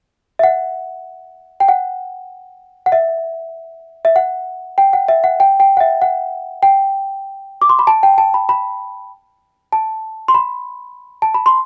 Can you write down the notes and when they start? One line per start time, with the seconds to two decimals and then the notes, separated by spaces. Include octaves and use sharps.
0.39 E5
0.43 F#5
1.60 G5
1.68 F#5
2.86 F#5
2.92 E5
4.05 E5
4.16 F#5
4.78 G5
4.93 F#5
5.08 E5
5.24 F#5
5.40 G5
5.60 G5
5.77 F#5
5.80 E5
6.02 F#5
6.63 G5
7.62 D6
7.69 C6
7.79 B5
7.87 A5
8.03 G5
8.18 A5
8.34 B5
8.49 B5
9.72 A5
10.28 C6
10.34 B5
11.22 A5
11.34 B5
11.46 C6